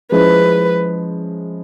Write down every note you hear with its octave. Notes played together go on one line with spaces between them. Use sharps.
F3 G#3 C#4 E4 B4